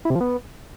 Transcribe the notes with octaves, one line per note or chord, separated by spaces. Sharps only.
E4
C3
F3
B3